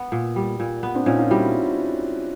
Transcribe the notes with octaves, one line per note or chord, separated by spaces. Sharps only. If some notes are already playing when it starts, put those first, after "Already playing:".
Already playing: B3
A#2
G3
A#2
B3
C4 D4
A#2 C#4 D#4
D#4 F4
G3 E4 F#4